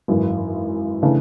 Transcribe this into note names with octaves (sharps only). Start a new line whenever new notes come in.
G#1 F#2 E3
C#3 E3 A3 D4